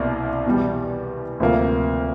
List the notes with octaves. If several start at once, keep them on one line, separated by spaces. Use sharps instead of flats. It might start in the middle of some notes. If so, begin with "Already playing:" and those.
Already playing: C2 B2 A#3
E2 B2 G3
D2 C3 F3 A#3